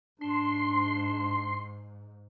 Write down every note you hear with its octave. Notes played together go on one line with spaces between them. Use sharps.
G#2 D4 C6